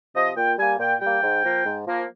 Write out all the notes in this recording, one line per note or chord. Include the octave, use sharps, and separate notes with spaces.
C3 F3 D#5
A#2 G5
G3 A#3 G#5
A#2 G5
G3 A#3 G5
G#2
F3 A#3
G#2
F3 A#3